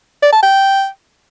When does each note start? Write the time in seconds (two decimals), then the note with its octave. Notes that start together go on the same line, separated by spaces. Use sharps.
0.22 D5
0.32 A5
0.42 G5